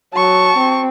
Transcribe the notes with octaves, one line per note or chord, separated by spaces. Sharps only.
F#3 A5 C#6
C4